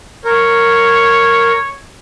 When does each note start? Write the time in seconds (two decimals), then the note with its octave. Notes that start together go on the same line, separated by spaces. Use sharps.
0.25 A#4 C#5